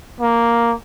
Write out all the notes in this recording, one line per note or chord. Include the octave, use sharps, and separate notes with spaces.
A#3